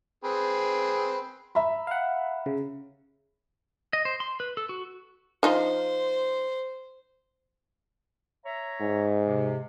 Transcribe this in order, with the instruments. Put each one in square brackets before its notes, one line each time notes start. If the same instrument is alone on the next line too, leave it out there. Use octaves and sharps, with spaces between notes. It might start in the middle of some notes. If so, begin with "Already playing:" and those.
[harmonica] C4 G#4 B4
[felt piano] E5 A#5 B5
[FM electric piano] F5 F#5
C#3
[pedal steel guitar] D#5
C5
C6
B4
A4
F#4
[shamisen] F3 D#4 F4 [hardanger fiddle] C5
[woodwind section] C#5 E5 A#5
[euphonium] G#2
[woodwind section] C3